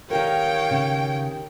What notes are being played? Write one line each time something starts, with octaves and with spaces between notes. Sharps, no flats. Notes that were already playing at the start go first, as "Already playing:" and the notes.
D#3 G4 A#4 C#5 F5 G5
C#3